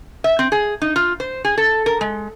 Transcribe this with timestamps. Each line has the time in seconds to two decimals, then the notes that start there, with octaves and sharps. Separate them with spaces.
0.24 E5
0.39 C4
0.52 G#4
0.82 D#4
0.96 F4
1.20 C5
1.45 G#4
1.58 A4
1.86 A#4
2.01 G#3